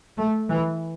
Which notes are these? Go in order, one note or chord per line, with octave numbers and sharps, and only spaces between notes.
A3
E3